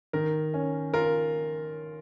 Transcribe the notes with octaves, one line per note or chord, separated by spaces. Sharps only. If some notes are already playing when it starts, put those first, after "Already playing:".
D#3 A#4
C#4
F4 A#4